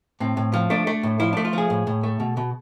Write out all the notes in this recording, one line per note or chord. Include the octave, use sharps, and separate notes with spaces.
A2 C4
A2
F3
A3 D4
A3
A2
F3 E4
A3 D4
F4
F3 G#4
A2
A2
A3
B2
B2